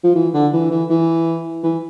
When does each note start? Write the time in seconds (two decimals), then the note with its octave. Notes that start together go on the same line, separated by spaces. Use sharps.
0.04 F3
0.15 E3
0.34 D3
0.53 E3
0.71 E3
0.89 E3
1.64 E3